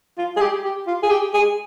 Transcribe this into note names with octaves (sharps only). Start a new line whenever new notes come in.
F4
G#4
G4
G4
F4
G#4
G4
G#4